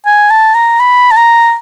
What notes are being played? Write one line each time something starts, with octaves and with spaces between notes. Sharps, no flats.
G#5
A5
A#5
B5
A5
A#5